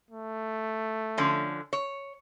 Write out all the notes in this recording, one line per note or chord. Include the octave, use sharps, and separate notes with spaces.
A3
D3 F3 C#4
C#5